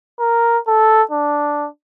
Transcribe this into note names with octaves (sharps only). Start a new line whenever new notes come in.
A#4
A4
D4